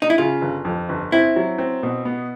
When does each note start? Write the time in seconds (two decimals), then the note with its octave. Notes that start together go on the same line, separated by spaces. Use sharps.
0.02 D#4
0.10 E4
0.18 C#3 F4
0.41 G1
0.65 F2
0.89 G1
1.12 C4 E4
1.36 F#3
1.58 C4
1.83 B2
2.05 B3